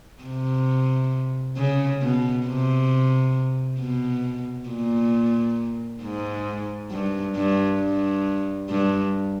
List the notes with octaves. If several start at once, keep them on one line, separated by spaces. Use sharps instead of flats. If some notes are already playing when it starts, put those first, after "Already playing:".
C3
C#3
B2
C3
B2
A#2
G#2
G2
G2
G2
G2